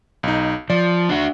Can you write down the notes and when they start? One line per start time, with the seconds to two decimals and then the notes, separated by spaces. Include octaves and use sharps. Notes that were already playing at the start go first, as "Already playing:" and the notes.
0.23 B1 D#4
0.70 F3 D5
1.09 D4 F#4